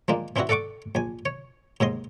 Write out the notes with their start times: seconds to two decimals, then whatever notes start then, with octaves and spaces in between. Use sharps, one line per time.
0.08 F3 G#3 A#3 D4
0.36 E3 C4 D4 E4 F#4
0.49 A4 D5 F#5 C#6 D6
0.95 A#1 G#5
1.26 C#5
1.80 D#2 G#2 D#5 C6